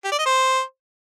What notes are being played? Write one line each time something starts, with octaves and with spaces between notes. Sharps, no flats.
G4
D5
D#5
C5